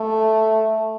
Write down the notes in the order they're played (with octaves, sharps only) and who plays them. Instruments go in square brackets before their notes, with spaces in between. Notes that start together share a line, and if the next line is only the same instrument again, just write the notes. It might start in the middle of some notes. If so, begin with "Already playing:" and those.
Already playing: [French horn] A3